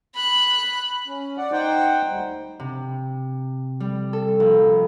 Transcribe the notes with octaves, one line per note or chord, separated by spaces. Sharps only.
B5 F#6
C#4
D5 F#5
D#4 C5 F#5 G5
D2 G3
C3
G3
A4
A#1